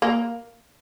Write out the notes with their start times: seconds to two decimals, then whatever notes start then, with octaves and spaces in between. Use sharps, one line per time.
0.02 A#3